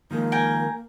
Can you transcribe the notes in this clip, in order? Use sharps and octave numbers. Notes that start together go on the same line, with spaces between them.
D#3 F3 G#3 A#3
G5 G#5 A#5